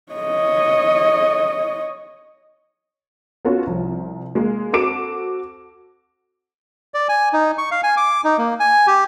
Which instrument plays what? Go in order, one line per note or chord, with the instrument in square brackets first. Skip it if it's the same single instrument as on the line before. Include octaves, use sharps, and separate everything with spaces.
[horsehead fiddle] C#5 D#5
[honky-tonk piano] B3 C#4 F4 F#4 A4 C#5
C2 F3
G#3 A#3
C4 F#4 A4 D6 D7 E7
[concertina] D5
G#5
D#4
C#6
F5
G#5
D6
D#4
A#3
G#5
G4